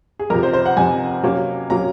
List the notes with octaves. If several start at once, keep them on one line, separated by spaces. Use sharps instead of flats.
G#4
F2 C3 F3 A#4
C5
C5
F#5
F2 C3 F3 G#5
C3 F#3 A#3 C#4
C3 F#3 A#3 C#4 A#5